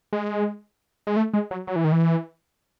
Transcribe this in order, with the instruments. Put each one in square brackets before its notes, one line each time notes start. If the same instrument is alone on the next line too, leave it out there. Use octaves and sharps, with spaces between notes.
[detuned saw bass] G#3
G#3
A3
G#3
F#3
F#3
E3
D#3
E3